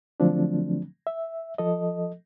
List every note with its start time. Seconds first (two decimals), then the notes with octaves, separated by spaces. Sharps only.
0.20 D3 F3 F#3 A3 C4 D4
1.07 E5
1.58 F3 A4 D#5